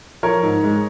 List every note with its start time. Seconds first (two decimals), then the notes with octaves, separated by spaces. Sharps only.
0.23 F3 A#4 C#5
0.43 G#2
0.64 G#3